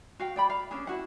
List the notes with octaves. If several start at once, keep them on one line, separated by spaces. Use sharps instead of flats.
F#4 F5 G5
D5 G5 B5
F5
C#4 D4 G#4
E4 F#4 F#5